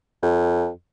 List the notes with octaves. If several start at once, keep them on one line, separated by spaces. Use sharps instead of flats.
F2